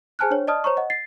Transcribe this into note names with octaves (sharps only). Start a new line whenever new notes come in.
G#4 C5 G#5 A5 F6 F#6
D4 C5 C#5
D5 D#5 A5 D#6 F6
C5 C#5 A#5 C#6
D#5 F#5
A6 C7